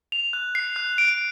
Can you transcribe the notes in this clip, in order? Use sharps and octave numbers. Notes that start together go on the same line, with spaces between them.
F7
F#6
C7
F#6
D7